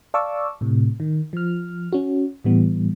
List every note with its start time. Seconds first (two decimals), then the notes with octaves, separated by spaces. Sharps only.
0.14 D5 F5 A5 C#6 D6 E6
0.61 A2 C3
1.00 D#3
1.33 F3 F6
1.92 C#4 F#4
2.44 A2 E3 G3 B3